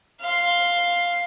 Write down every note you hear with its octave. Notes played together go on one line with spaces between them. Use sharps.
F5 C6